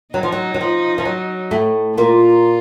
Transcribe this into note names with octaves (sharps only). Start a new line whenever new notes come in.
F#3 D#4
F3
F#3
F#3
F3
F3
F#3
A2 A3
A#2 A#3 F4